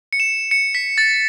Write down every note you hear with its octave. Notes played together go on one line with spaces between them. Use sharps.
C#7
E7
C#7
B6
A6